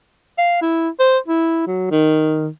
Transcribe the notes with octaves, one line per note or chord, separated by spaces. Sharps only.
F5
E4
C5
E4
F#3
D#3